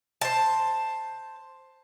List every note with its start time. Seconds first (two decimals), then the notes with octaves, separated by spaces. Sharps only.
0.21 C5 A5